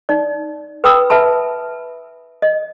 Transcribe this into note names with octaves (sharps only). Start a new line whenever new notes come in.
D#4 D5
B4 G5 B5 D#6 E6
B4 E5 G#5 A5 B5
D#5